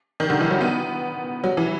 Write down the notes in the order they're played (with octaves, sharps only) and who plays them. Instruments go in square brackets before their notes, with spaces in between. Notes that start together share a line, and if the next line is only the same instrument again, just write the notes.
[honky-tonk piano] D#3
D3
E3
F#3
B3
F#3
E3